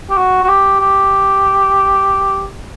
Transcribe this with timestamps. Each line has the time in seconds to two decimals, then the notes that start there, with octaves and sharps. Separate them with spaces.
0.10 G4
0.17 F#4
0.43 F#4
0.49 G4
0.79 G4